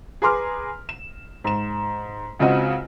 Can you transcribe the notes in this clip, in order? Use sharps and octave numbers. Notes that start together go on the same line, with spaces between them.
G#4 B4 A#5 C6 D6 F6
E7
G#2 E7
C#2 C#3 C4 F#4 D#5